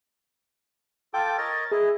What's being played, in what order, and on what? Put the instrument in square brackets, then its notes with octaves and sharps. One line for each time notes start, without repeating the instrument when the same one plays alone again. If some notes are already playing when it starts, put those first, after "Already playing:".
[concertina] F4 A4 D6 [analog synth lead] G5
[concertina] A#4 C#5 D#5 [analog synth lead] A6
[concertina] E4 D#5 [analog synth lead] G#4